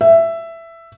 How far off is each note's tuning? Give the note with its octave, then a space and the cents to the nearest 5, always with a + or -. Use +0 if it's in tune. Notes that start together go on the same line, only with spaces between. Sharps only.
E5 +10